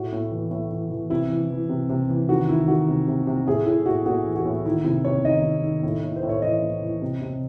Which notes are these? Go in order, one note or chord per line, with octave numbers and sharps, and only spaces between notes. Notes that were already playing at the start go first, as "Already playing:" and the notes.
Already playing: A2 F#4
A2
E3
A2
E3
E3
C3 E4
E3
E3
C3
C3
E3
D#3 F#4
D#3 E4
D#3 F#4
C3
C3
C3
A2 G#4
A2 E4
A2 F#4
A2 F#4
E3
F#4
A2
D#3 E4
C3 E4
C3 C#5
D#3 D#5
D#3
D#3
A2
A2
C5
A2
C#5
E3 D#5
A2
E3
C3
C3